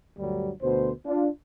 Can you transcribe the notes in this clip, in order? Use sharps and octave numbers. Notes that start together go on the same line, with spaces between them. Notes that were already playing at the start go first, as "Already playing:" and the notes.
D2 G2 F#3 G3
D2 B2 C5
D4 F4